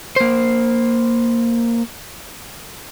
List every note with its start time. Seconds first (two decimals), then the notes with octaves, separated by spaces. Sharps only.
0.16 A#3 C5